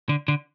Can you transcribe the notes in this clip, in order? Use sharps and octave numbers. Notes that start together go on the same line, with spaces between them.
D3
D3